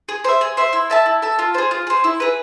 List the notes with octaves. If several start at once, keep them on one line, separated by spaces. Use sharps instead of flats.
G#4
C5 E5
G#4
C5 E5
E4
A4 E5 A5
E4
A4 E5 A5
F4
G#4 C5
F4
G#4 C5
E4
G#4 B4